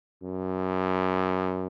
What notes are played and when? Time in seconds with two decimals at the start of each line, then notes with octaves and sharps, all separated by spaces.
0.23 F#2